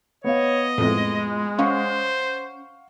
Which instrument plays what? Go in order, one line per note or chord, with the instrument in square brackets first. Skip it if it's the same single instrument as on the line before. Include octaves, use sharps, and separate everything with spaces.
[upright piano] B3 F5 [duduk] C#5 [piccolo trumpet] D#5
[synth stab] F2 A2 [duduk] G#3
[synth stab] C#4 [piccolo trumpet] C5 [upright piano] F5 F#5 C#6